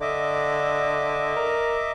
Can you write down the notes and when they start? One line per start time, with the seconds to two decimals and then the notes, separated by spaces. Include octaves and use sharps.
0.01 D3 D#5 E5 D6
1.37 A#4